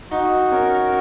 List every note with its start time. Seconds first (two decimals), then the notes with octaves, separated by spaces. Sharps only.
0.11 D#4 F#4
0.51 C#4 A#4